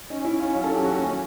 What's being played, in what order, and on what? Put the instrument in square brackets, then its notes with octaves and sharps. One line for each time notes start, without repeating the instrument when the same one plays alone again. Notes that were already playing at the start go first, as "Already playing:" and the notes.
[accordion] C#4 [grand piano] D#4
[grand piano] E4
[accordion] C#4
[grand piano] F4
[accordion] F#3 [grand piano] F4
[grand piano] A4
[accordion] C#4 [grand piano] G4
[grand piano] F#4
[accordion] D#2 [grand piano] F#4